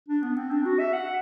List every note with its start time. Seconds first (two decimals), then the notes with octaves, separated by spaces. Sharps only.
0.09 D4
0.23 B3
0.36 C4
0.51 D4
0.65 F#4
0.79 E5
0.93 F#5